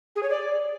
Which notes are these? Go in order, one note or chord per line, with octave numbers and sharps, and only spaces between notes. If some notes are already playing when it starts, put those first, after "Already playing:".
G#4
C#5
D5